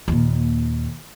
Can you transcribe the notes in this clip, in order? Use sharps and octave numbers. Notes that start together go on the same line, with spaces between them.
D#2 A#2